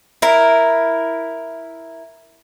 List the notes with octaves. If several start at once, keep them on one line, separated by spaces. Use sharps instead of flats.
E4 A#4